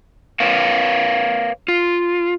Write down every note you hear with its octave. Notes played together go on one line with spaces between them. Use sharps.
A#4 B4 C#5 F5
F4